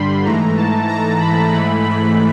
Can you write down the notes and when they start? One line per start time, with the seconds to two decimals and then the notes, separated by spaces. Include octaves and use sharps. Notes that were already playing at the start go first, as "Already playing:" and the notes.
Already playing: G2 D3 G3 B5 C6
0.25 G#2 E3 A3 A#5
0.57 A5
0.88 A#5
1.20 B5
1.51 G#2 E3 A3 B5
1.83 B5